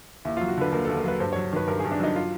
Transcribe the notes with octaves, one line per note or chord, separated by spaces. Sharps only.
D#2 E4
F4
F#3
F#4
D3 B4
D#2 A#4
A4
D#2
A#4
F#3 B4
G2 C5
C#5
F#3
D#3 B4
G2 A#4
G#4
G2
D4
F#3 D#4
F4